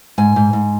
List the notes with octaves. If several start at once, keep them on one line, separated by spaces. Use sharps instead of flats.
G#2 G#5
G#2
G#2